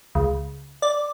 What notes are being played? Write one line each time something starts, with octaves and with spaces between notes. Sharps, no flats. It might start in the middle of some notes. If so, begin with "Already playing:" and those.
C#2
D5